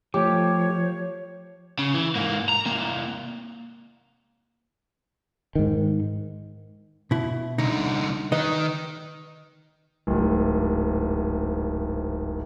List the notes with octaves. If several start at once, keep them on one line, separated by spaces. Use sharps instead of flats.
F3 A3 G4 C#5 D6
C#3
E3
G#2 A#3
A#5
C3 A#3
G#2 D#3
B2 E4
C2 D3 D#4
D#3 D#4 B4 D#5
D1 G#1